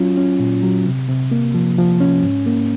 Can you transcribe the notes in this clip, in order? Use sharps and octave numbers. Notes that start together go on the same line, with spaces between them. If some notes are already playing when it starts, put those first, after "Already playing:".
Already playing: F#3 C#4 F4
C#4
A#2
F#3
C3
C3
A#3
F3
F3
C#4
G#2
A#3